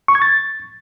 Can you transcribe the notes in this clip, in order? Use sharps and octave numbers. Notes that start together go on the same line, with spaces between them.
C#6
G#6
A6